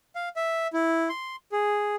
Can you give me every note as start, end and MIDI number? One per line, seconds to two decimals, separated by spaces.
0.16 0.29 77
0.36 0.67 76
0.73 1.09 64
1.09 1.36 84
1.52 1.96 68